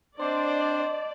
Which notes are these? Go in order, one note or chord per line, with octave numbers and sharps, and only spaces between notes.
C4 D4 C5 D5 D#5